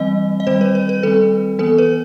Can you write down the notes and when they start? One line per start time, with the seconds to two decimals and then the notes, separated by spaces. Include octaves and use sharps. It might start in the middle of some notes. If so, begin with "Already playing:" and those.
Already playing: E3 G3 C4 D#5
0.40 D#5
0.47 D#3 G3 C4 C5
0.61 B4
0.75 B4
0.89 B4
1.03 D#3 G3 C4 A4
1.59 E3 B3 A4
1.78 B4